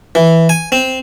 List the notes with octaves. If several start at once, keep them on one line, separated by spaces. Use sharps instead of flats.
E3
G#5
C4